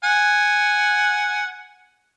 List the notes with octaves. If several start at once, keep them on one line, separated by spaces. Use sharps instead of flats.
F#5 G#5